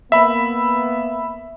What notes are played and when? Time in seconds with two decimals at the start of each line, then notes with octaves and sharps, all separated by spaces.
0.12 A#3 B3 E5 B5